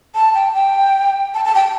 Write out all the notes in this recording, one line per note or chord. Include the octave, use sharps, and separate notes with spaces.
A5
G5
G5
A5
A5
G5